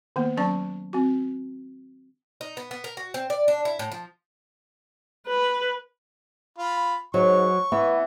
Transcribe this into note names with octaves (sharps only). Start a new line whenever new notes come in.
D#3 A#3 B3
F#3 C#4 D5 A5 C#6
C4 F#4
D#4
B3
B3
A#4
F#4
C4
D5
D4
E4
A2
F3
B4
F4 B5
G#2 F#3 C#6
E3 B3